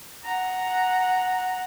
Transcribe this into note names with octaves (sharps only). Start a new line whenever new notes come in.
F#5 A#5